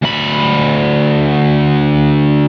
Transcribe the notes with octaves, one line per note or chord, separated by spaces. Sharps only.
D2 B5